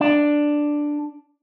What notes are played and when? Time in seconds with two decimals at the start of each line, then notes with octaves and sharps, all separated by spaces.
0.01 D4